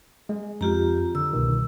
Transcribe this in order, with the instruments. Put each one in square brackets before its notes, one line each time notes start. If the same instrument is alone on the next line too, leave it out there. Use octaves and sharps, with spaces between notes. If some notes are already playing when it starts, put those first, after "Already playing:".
[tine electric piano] G#3
[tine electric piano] F2 [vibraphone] F4 G4 A#5
[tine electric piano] D3 [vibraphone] E6
[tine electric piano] C2 B2 D#3